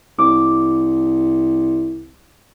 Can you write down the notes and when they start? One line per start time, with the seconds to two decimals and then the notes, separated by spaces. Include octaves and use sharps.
0.19 C2 D6